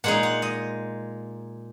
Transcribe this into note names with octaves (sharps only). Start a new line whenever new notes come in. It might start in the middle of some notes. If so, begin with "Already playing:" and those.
A#2 G#3 D#4 F#5
F#5
D#5